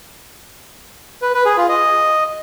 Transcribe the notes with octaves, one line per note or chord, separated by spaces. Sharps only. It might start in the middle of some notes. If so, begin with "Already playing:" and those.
B4
B4
G#4
F4
D#5